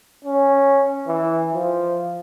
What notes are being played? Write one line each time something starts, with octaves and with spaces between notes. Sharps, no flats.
C#4
E3
F3